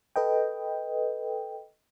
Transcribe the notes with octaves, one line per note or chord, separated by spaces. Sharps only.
A4 B4 D#5 G5